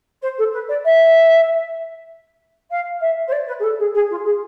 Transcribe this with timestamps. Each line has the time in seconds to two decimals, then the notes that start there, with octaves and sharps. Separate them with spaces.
0.22 C5
0.38 A4
0.53 B4
0.69 D5
0.85 E5
2.70 F5
3.01 E5
3.27 C5
3.32 D5
3.47 B4
3.59 G#4
3.63 A4
3.79 G#4
3.94 G#4
4.10 F4
4.25 G#4